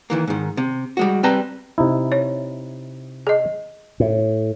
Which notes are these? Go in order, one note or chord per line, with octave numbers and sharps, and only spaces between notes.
D#3 E3 A#3
G#2 D#3
C3
G3 G#3 F#4
G3 C4 B4 G5 A5 A#5
C3 D#4 E4
C#5
G#4 D#5
A2